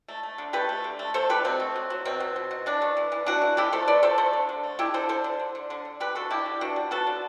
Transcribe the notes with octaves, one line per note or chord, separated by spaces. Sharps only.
A3
A3
D3
A3 G4 B4
A3
D3
A3
A3 A4 C5
D3 G4 B4
B2 C4
A3
F#3
F#3
B2 C4
B2
B2
B2
E3 D4
A3
E3
E3
E3 D4 F#4
E3
A3 E4 G4
A3 A4 C5
A3 B4 D5
A3 A4 C5
A3 A4 C5
D3
D3
A3
D3 E4 G4
D3 A4 C5
D3 A4 C5
D3
D3
D3
D3
D3
D3 G4 B4
D3 F#4 A4
D3 E4 G4
G3
B3 D4 F#4
G3
B3 F#4 A4
D3